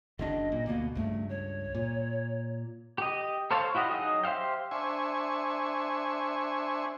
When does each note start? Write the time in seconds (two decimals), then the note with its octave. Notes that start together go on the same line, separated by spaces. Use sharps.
0.19 F#1 F#2 D4 D#5
0.52 A#2
0.66 D2 B2 A#3
0.95 C#2 G2 A3
1.29 C#5
1.75 A#2
2.98 G4 D#5
3.51 A4 C5 C#5 F5 A5
3.75 E4 F#4 G4 D#5 F5
3.91 F#3 D#4 G#4 D#5
4.24 G4 C5 E5 F5 G5
4.71 D4 C5 E5 G#5 C#6